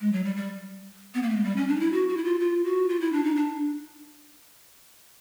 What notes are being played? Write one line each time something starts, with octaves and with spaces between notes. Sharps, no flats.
G#3
F#3
G3
G3
B3
A#3
A3
G#3
G3
C#4
D4
D#4
E4
F#4
F#4
E4
F4
F4
F#4
F4
E4
D4
D#4
D4